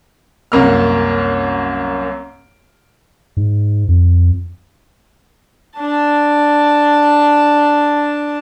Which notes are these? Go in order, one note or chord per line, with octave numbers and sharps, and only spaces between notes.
C2 F#2 A#3 F6
G#2
F2
D4 A5